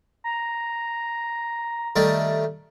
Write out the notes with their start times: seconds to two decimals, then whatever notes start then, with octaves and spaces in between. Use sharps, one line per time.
0.24 A#5
1.96 D#3 G3 A3